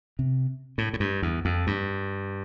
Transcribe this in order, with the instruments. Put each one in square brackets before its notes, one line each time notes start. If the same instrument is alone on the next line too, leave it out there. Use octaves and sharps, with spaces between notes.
[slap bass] C3
A2
A2
G2
E2
F2
G2